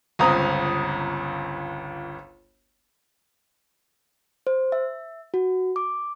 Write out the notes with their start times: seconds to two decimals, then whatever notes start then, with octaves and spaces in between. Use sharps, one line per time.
0.19 G1 C#2 C4 A#5 D#6
4.47 C5
4.72 E5
5.34 F#4
5.76 D6